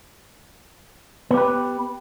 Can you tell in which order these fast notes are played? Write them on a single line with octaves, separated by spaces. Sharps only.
B3 G4 B4